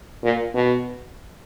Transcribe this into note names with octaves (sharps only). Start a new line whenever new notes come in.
A#2
B2